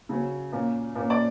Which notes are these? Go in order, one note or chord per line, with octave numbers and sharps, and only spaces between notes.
C#3 F#3 C#4
A#2 A#3 C#4
A#2 A#3 C#4
D5